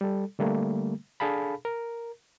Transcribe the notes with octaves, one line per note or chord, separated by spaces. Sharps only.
G3 A4
D3 G3 A3 A#3
D4 G#4 A4 F5 A5 B5
A#4